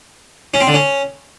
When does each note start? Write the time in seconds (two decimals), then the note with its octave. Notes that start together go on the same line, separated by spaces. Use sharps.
0.54 C#4
0.60 C4
0.67 D3
0.74 C#4